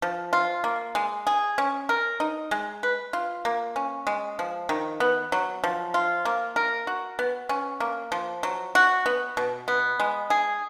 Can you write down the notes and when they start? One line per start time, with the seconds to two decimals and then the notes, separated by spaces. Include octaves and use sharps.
0.02 F3
0.33 F4
0.64 A#3
0.95 G#3
1.27 G#4
1.58 C#4
1.89 A#4
2.20 D#4
2.51 G#3
2.83 B4
3.13 F4
3.45 A#3
3.76 C#4
4.07 G#3
4.39 F3
4.69 D#3
5.00 B3
5.32 F#3
5.64 F3
5.94 F4
6.25 A#3
6.56 A#4
6.87 F#4
7.19 B3
7.49 C#4
7.80 A#3
8.12 F3
8.43 F#3
8.75 F#4
9.06 B3
9.37 B2
9.68 B3
10.00 G#3
10.30 G#4